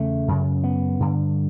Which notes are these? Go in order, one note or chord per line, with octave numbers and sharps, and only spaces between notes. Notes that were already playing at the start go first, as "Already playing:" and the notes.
Already playing: E2 C#3 A3
F#2 C#3
B3
G2 D3